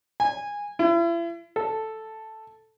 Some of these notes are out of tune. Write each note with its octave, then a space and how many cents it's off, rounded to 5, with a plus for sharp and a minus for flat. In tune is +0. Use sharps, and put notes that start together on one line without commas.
G#5 -15
E4 +40
A4 +0